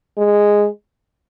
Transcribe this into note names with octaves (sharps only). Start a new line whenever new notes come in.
G#3